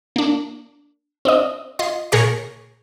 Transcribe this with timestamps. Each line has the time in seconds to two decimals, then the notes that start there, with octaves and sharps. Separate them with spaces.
0.16 A#3 D4
1.25 C4 D4 D#5
1.79 F4 D#5 C6
2.12 A#2 G#4 A#4 C#5 C#6